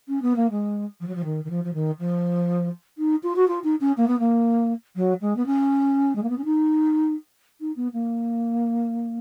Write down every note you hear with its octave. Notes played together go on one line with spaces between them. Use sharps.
C#4
B3
A#3
G#3
F3
F#3
F3
D#3
D#3
F3
F3
D#3
F3
D#4
F4
F#4
F4
D#4
C#4
A#3
B3
A#3
F#3
G#3
B3
C#4
G#3
A#3
B3
C#4
D#4
D#4
B3
A#3